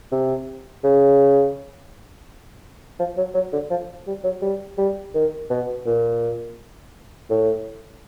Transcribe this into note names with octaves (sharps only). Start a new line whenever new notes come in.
C3
C#3
F3
F#3
F#3
D3
F3
G3
F#3
G3
G3
D#3
B2
A#2
A2